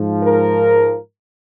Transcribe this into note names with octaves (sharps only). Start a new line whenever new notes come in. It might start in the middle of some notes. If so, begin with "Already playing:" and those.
Already playing: G#2 F3
A#4